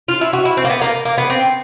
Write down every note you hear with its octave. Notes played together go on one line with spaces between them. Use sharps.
F4
E4
F#4
E4
C4
A#3
B3
A#3
A#3
B3
C4